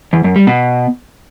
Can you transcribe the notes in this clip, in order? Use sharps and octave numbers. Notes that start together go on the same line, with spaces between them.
E2
F#2
G3
B2